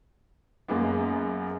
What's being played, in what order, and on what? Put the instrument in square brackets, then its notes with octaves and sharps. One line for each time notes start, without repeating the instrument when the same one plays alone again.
[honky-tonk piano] F#2 G#3 A#3 B3